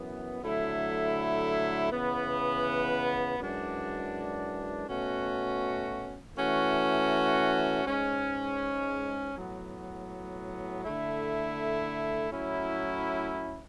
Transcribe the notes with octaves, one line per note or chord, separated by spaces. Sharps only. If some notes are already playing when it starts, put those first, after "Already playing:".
Already playing: F#2 E3 B3
D3 F#3 A3 E4
C#3 E3 B3
F#2 E3 G#3 D4 F#4
B2 A3 C#4 F#4
E3 A3 C#4 F#4
G#2 G#3 C#4
A2 F#3 B3
D3 A3 E4
A2 F#3 C#4 E4